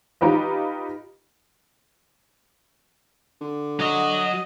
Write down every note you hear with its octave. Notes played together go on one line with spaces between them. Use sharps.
D#4 F4 G4 B4 D#5
D3
F#3 F#4 D#5